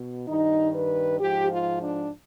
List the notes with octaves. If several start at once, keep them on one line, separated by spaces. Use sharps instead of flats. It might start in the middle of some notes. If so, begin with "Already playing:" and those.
Already playing: B2
G2 D#3 D#4
B4
G#2 F3 G4
F4
D4